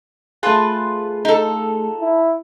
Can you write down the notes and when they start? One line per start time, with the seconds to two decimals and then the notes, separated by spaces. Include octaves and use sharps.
0.43 A3 F4 G#4 B4 A5
1.25 D#4 A4
2.01 E4